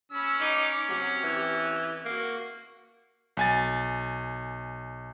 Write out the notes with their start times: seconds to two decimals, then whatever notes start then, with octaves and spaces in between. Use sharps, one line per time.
0.12 C#4 B5 E6
0.41 D#4 D6
0.89 C3 F#3 G4
1.23 E3
2.05 A#3 F#4
3.37 B1 G#5 A6